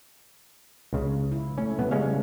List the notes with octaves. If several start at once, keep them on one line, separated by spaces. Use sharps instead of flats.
C#2 C#3
E4
A3 C#4
C#3 G3 B3
G#3 C#4 F5